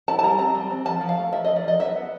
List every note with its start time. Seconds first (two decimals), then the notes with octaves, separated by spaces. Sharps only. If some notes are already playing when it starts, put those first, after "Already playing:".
0.08 E4 A5
0.19 A5
0.23 G3 A#5
0.39 C4 A#5
0.55 G3
0.71 C4
0.85 F3 A5
1.01 F3
1.09 F5
1.18 A3
1.33 F3 E5
1.45 F3 D#5
1.56 D5
1.64 F3 D#5
1.80 F#3 E5
1.95 B3